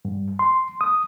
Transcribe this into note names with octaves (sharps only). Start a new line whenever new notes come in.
G2
C6
D#6